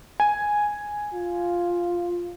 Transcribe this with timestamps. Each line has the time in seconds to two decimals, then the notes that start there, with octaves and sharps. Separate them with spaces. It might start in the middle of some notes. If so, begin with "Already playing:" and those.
0.20 G#5
1.14 F4